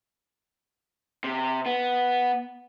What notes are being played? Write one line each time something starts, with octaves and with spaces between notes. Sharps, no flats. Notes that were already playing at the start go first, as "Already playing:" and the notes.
C3
B3